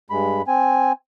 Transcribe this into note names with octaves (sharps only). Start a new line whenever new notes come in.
G2 G#3 B5
C4 G#5